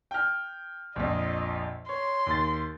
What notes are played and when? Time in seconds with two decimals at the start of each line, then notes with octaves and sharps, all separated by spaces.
0.11 G5 F6
0.96 A#1 F2 D#5
1.89 C#5 C6
2.26 D#2 A6